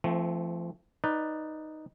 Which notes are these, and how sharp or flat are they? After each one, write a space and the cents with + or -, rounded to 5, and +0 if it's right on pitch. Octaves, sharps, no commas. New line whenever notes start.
F3 -35 A3 +0 C4 -5
D#4 +0 B4 +0 D5 +10